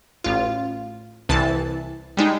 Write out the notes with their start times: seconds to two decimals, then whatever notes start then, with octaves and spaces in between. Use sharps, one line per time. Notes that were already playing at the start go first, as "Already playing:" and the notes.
0.24 A1 F4
1.29 C2 E3 A5
2.17 G3 G#3 D#4